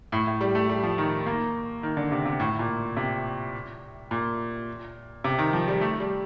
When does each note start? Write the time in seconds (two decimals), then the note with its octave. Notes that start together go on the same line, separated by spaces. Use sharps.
0.12 A2
0.27 A2
0.41 G3
0.55 A3
0.69 G3
0.83 F3
0.98 D#3
1.26 A#3
1.83 D#3
1.97 D3
2.12 C3
2.26 C3
2.40 A2
2.59 A#2
2.97 C3
4.11 A#2
5.24 C3
5.39 D#3
5.53 F3
5.68 G3
5.81 A3
6.00 G3